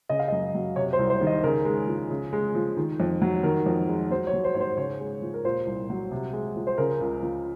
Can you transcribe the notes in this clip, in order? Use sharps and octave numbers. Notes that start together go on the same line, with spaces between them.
C#3 D#5
F5
F#2 D#5
F#3
C3 C#5
C5
C2
C5
D#3
D#5
C#3 A#4
G#3
F3
C#3
G#3
F3
D#3
F2
F#3
D#3 A#4
F2
G#3
F#3 C5
C#5
F#3
C5
G#2 C#5
C5
C#3 C#5
G#3
F3
A#4
A#2 C5
C2
F#3
C3
G#3
F3
C5
C#3 A#4
C#2
F3